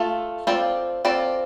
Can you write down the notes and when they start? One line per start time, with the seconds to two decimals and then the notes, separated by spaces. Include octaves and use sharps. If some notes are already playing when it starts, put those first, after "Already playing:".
Already playing: A3 F4 A4
0.47 C4 F4 A4 D5
1.05 C4 F4 A4 D5